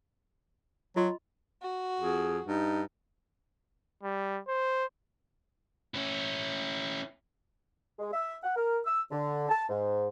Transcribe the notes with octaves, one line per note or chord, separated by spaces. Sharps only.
F#3 F4 D#5 C6
F#4
F2 G#4
G2 D#4
G3
C5
C#4 E4
G#3
E5
F#5
A#4
E6
D3
A5
G#2